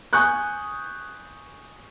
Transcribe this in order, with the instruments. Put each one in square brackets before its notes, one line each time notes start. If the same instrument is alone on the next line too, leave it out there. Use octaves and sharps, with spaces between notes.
[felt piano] G#5 C#6 D#6 F#6 G6